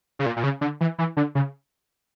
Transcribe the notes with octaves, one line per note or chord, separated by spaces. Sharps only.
C#3
A#2
A#2
C#3
D3
E3
E3
D3
C#3